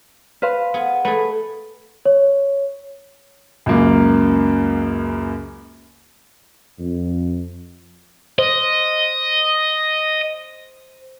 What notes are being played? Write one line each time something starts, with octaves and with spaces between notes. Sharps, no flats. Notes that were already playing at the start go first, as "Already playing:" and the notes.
B4 C5 F5
B3 G#4
A3 G#4 B4
C#5
C#2 F#2 A#3
F2
C5 D#5